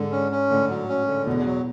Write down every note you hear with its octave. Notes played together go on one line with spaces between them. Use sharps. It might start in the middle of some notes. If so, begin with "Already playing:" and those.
Already playing: G#2 D3
C#4
C#4
A2 D3
F#3
C#4
D3
E2 B2
F#3